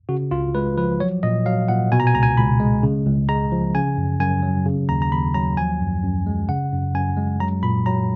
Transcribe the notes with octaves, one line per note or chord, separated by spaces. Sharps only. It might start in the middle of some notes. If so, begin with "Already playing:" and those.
C#3 F#4
C#2 F4
G#3 B4
F3 B4
F#3 C#5
A#2 D#5
F#3 F5
A#2 F#5
B2 G#5
A#5
G#5
C#2 A#5
G#5
C#2 B5
G#3
C#3
C#2
G#3 A#5
F3
C#3 G#5
F#2
F#2 G#5
F#3
C#3
D#2 A#5
A#5
D#2 B5
F#3 A#5
F3 G#5
F#2
F#2
G#3
C#3 F#5
F#2
F#2 G#5
G#3
F#3 A#5
A#2 B5
F#3 A#5